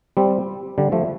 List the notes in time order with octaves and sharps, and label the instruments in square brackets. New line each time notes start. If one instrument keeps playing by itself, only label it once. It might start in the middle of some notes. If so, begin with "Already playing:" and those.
[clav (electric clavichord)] G3 C4
D3 G3
F3 A3